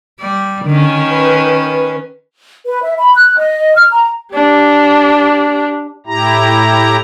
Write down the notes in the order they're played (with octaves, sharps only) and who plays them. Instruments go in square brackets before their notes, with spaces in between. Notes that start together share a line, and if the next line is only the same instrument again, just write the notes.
[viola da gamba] G3 D5
[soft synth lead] D3 [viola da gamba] D#3 C#4
[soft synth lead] B4
[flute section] B4
E5
B5
F#6
D#5
F6
A#5
[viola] D4 G4
[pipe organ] A2 E4 G4 A#5